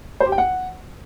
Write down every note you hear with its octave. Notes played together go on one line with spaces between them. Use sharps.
C5
G4
G5
F#5